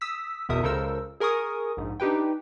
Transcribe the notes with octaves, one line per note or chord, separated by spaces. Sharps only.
D#6 E6 B6
G#1 E2 B2 A#4 E5 D#6
C#2 C#3 A4 A#4 C5 E6
G#4 A#4 G#5 C#6 D#6
A#1 G#2
D4 D#4 G4 B4 G5